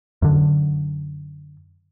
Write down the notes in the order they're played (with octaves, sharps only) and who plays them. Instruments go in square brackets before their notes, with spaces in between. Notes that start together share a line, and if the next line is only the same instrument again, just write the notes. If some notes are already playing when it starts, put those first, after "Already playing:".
[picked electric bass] F#2 D3